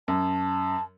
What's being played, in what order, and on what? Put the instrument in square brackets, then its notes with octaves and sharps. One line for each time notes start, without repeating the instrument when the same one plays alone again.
[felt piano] F#2 [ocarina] A5